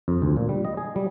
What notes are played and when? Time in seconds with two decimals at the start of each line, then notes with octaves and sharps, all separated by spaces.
0.08 F2
0.22 D2
0.37 A#2
0.49 G3
0.65 D#5
0.77 G#4
0.96 G3